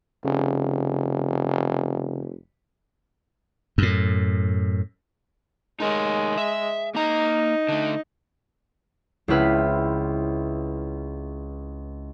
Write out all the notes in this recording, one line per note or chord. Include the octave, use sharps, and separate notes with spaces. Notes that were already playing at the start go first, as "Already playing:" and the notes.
F1 C#3
F#2 A2
G#3 D#4 A#4 C#5
E5
A#3 D#4 A#5
D3 A3
C#2 C4 C#4 E4 B4 F6